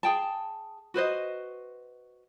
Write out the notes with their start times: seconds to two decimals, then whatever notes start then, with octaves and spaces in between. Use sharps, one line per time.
0.03 G#4 G5 A5
0.94 F#4 B4 C5 D#5